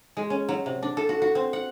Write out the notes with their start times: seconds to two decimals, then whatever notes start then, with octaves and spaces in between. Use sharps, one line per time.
0.17 G#3
0.30 C#4
0.49 F#3
0.66 C3
0.83 D4
0.97 A4
1.09 F#4
1.22 F#4
1.35 C4
1.53 F#5